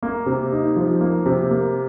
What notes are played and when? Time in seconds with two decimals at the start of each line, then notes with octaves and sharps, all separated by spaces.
0.03 A#3
0.26 C3
0.52 D#4
0.76 F3
1.01 A#3
1.26 C3
1.51 A#3